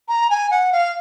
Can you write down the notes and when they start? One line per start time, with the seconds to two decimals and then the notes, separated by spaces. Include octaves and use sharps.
0.08 A#5
0.30 G#5
0.51 F#5
0.72 F5